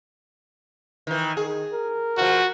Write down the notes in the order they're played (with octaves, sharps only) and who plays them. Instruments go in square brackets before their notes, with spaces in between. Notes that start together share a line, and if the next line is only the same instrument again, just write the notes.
[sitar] D#3 E3
[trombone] D#3 [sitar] G#4
[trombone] A#4
[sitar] B2 F3 [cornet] F#4